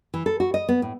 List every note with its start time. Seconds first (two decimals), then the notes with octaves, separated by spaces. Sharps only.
0.14 E3
0.26 A4
0.40 F#4
0.54 D#5
0.69 B3
0.82 A2